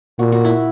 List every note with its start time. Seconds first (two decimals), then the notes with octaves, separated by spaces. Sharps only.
0.19 A#2 F#4
0.32 F#4
0.45 E4